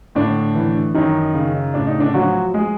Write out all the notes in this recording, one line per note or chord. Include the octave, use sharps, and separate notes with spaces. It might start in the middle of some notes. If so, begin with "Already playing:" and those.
A2 D3 D4
E3
F#2 D#3 D#4
C#3
A2 D4
D#4
D3 D4
F3 F#3 F#4
G#3 G#4